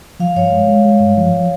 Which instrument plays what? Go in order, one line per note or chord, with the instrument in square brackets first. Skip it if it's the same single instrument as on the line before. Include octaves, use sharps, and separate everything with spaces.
[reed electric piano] F3 [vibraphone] F5
[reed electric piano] G2 [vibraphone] C#5 F5
[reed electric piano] G#3
G#3
G#3
G2
F3